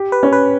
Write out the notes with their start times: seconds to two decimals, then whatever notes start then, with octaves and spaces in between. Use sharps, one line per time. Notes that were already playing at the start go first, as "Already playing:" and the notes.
Already playing: G4
0.12 B4
0.23 C#4
0.32 B4